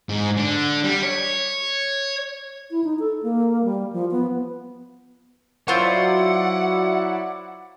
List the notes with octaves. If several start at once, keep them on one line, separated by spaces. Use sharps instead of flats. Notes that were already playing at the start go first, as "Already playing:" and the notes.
G#2
D3
G3
C#5
E4
D#4
A4
A#3
G3
F3
B3
F#3 E4 F4 C5 D5 F#5 C#6